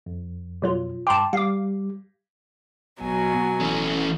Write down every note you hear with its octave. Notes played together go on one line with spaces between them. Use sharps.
F2
B2 F#3 F4
G2 G5 A5 C6 D6
G3 F5 D6
A1 B2 F#3 G#5
E1 E3 C#4